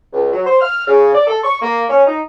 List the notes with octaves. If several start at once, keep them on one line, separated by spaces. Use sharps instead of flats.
C#2
F#3
C5
F6
C#3
D5
A4
C#6
A#3
C#4
D#4